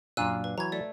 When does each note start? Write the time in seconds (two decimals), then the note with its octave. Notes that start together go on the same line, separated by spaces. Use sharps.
0.17 F#2 A#2 D4 F5 E6 F#6 D#7
0.44 B4
0.58 E3 F#3 A#5 G#6
0.72 A3 D5